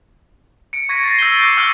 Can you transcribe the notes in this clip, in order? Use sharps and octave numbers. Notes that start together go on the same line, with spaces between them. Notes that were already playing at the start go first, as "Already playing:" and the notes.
C#7 D7
C#6 G#6 A#6 B6 C#7 D#7
A6 A#6 C7
E6 G6 A#6 D#7 G7
D6 G6 D7
C#6 E6 F6 G6 D7